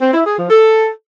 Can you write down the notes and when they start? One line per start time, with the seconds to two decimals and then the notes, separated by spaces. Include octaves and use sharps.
0.01 C4
0.13 E4
0.25 G#4
0.37 F3
0.49 A4